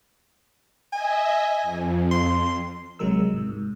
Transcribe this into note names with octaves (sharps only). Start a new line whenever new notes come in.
D#5 E5 G#5
F2
C6
A#1 C3 F#3 G#3 A#4 E6
G#2 C3
G#2